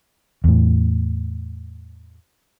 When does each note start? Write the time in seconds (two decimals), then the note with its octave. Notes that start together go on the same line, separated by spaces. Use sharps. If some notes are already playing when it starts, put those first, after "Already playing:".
0.44 E2 A2